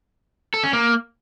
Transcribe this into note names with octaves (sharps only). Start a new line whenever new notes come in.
A4
C#4
A#3